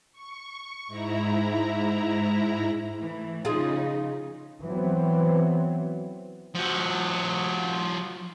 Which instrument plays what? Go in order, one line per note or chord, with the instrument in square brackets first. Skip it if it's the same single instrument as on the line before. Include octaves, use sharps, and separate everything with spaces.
[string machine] C#6
G#2 E4 A#5
[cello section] E3 A3
[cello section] C#3 F3 D#4 [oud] F4 G#4
[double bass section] E3 F#3 B3 C4
[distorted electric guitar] F3 F#4